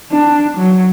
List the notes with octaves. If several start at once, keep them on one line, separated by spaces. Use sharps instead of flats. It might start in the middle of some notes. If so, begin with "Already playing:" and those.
D4
F#3